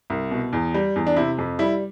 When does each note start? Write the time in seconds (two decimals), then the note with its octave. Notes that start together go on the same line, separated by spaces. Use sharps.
0.10 C2
0.31 B2
0.53 E2
0.74 G3
0.96 E2
1.07 D4
1.16 C3 E4
1.38 F2
1.59 G3 E4